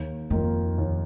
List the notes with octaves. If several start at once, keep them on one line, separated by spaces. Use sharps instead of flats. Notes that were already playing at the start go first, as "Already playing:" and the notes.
Already playing: D#2
F2 D#3 A#3 F4
D#2